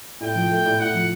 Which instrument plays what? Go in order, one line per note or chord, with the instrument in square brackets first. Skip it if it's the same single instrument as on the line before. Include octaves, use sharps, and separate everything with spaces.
[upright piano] A2 [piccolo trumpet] G5
[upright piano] F3
A3
A2
[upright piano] A2 [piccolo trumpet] F#5
[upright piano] F3